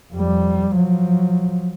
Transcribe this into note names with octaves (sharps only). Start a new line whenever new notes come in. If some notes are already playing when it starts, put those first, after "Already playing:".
F2 G3
F3 F#3